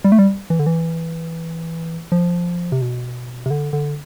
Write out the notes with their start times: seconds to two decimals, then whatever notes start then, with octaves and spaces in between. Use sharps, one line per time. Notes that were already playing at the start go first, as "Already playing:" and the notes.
0.04 G3
0.12 A3
0.19 G3
0.50 E3
0.59 D3
0.66 E3
2.12 F3
2.72 C3
2.82 B2
3.46 C3
3.50 D3
3.73 D3